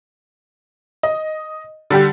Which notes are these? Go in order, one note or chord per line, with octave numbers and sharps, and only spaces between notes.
D#5
D3 G3 G4